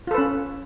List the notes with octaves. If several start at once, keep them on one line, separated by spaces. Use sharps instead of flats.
C#4 F4 A4 B4